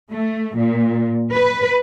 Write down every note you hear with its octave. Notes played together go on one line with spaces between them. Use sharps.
A3
A#2
B4